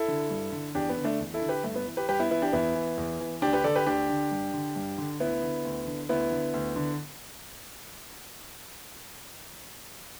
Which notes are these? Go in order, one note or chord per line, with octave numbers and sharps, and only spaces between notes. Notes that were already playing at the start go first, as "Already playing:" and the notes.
Already playing: E4 A4
D3
G2
D3
E2 D4 G4
B3
D3
A3 D4
E2
E4 A4
D3
G4 B4
G2 A3
B3
E3
G4 B4
G2 G4 B4
B3 E4
E3 B3 E4
D4 G4
E2 B3 E4
E3
E2
E3
D2 D4 G4
G4 B4
D3 A4 D5
G4 B4
D2 D4 G4
D3
G2
D3
G2
D3
D2 B3 E4
D3
D2
D3
D2 B3 E4
D3
D2
D3